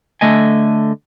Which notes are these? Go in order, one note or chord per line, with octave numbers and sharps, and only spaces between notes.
D3 A3 D#5 G#5